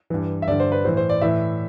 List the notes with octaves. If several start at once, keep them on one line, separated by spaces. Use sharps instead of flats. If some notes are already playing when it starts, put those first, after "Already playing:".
G2 E3
E5
G2 D3 D5
C5
B4
A2 E3 C5
C5
D5
A2 E3 E5